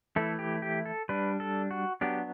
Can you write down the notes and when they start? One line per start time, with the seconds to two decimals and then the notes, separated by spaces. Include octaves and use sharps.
0.16 E3 A3 E4 A4
0.39 G4
0.62 G4
0.85 A4
1.09 G3 D4 B4
1.40 A4
1.71 F#4
2.01 F#3 B3 D4 G4